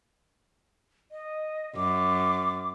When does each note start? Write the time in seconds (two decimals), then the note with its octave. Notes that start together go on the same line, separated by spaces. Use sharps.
1.12 D#5
1.76 F#2 D6